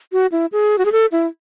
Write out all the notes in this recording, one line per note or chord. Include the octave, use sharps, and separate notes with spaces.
F#4
E4
G#4
F#4
G#4
A4
E4